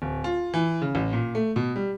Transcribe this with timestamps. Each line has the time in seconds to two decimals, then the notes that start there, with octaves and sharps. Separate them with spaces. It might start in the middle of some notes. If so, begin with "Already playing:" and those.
0.02 D1
0.24 F4
0.54 E3
0.82 C#3
0.95 A1
1.13 A#2
1.35 A3
1.56 B2
1.76 G3